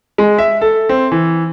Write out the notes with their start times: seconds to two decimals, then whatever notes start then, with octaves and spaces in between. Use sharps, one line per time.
0.18 G#3
0.38 E5
0.61 A4
0.89 C4
1.12 E3